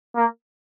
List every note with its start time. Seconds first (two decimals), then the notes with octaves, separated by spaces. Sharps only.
0.16 A#3